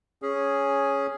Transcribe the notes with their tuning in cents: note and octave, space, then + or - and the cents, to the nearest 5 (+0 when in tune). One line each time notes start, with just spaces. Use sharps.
C#4 +0 G#4 +0